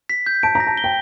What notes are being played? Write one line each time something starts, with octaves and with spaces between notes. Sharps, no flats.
B6
G6
A5 D7
A#5
A#6
A5
G7
G5